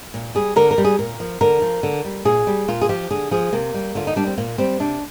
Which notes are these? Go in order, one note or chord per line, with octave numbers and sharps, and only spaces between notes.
A#2
G3 G#4
D3 A#4
A#4
G3
G#4
A#2 A#4
F3
D3 A#4
F3
D3
G3
A#2 G#4
G3
A#2 F4
G#4
F3 G4
D3 G#4
F3 G#4
C3 A#3
G3
D3 F4
D#4
G3 D4
C4
A#2 A#3
G3 C4
C3 D4